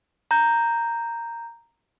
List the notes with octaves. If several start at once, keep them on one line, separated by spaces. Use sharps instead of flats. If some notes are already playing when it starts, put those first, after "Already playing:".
A#5 G6